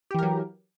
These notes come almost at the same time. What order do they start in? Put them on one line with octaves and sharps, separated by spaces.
G4 E3 A#4 F#3